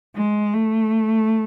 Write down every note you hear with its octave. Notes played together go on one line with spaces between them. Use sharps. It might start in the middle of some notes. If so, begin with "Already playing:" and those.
G#3
A3